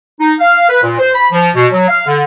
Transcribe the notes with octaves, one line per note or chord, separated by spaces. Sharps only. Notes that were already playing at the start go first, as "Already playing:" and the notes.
D#4
F5
B4
A#2
C5
B5
F3
B2
F#3
F5
D3